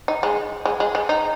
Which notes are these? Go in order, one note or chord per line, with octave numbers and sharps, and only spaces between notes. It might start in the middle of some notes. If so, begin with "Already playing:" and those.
D#4
G#3
G#3
G#3
G#3
D#4